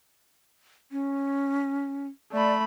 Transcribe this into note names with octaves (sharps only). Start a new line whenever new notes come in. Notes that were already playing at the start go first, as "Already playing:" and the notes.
C#4
A3 D5 B5